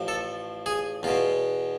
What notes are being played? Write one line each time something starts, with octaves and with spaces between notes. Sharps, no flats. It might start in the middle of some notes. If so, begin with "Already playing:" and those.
Already playing: A1 A2 F3
A4
G#4
E2 B2 F4